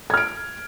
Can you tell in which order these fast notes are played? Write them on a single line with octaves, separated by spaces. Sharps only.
G#6 F6 D7